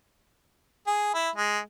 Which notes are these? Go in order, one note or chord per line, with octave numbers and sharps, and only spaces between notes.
G#4
E4
G#3